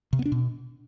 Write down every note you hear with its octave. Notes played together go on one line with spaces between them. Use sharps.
C3
B3
D4
B2